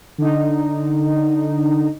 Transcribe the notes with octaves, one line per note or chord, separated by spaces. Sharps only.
D3 D#4